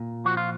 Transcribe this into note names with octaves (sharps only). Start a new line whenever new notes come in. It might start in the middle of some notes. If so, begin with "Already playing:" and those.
Already playing: A#2
F3 F#4
F4